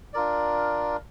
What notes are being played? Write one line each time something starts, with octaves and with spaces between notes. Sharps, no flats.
D4 F4 A#4 D5